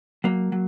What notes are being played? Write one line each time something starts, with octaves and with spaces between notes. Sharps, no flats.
F#3 A#3
F#3